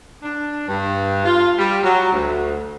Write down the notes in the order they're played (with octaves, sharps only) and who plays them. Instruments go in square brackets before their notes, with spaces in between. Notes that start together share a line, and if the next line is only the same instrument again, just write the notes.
[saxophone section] D4
G2
F4
G3
F#3
D2